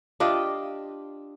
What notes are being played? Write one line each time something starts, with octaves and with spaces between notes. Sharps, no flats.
D4 F4 G4 D#5